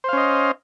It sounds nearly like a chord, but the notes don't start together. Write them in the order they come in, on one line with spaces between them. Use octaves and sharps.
C5 F5 C#4 D#5